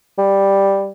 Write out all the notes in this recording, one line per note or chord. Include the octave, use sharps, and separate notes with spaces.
G3